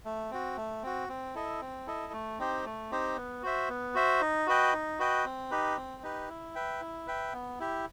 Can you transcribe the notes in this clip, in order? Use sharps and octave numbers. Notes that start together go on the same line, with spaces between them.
A3
C4 F#4
A3
C4 F#4
C4
E4 A4 D#5
C4
E4 A4 D#5
A3
C4 D#4 G4 C5
A3
C4 D#4 G4 C5
B3
F#4 C5 E5
B3
F#4 C5 E5
D#4
F#4 B4 D#5 G5
D#4
F#4 B4 D#5 G5
C4
D#4 G4 B4
C4
D#4 G4 B4
E4
B4 E5 G5
E4
B4 E5 G5
B3
E4 G4